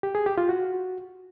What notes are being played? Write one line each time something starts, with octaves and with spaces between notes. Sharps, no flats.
G4
G#4
G4
F4
F#4